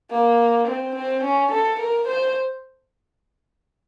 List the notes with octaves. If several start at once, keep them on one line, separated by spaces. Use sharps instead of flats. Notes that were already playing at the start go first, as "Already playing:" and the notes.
A#3
C4
C4
C#4
A4
A#4
C5